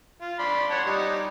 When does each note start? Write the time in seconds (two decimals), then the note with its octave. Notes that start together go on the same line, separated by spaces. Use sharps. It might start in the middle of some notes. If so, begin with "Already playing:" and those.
0.22 F4
0.39 D4 B5 C6
0.71 C#5 F#5 A5
0.87 G3 D#4